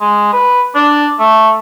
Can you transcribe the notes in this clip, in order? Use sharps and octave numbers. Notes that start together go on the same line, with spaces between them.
G#3
B4
D4
A3